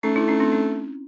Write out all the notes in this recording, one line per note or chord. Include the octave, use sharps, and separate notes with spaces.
A3 C#4 D#4
D4 E4
C#4 D#4
C4 D4
C#4